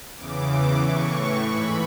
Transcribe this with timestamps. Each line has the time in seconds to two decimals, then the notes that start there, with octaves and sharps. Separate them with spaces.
0.16 E2 C#3 E3 D6
0.48 D6
0.80 A2 E3 C#6
1.45 G#2 E3 B5